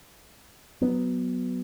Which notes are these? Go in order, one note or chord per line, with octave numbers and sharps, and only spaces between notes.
F#3 B3